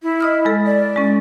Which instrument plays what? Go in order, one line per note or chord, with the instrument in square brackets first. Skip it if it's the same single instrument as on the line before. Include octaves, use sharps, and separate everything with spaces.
[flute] E4
[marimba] D#5 D#6 F6
G#3 A4
[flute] D5
[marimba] G#3 C#4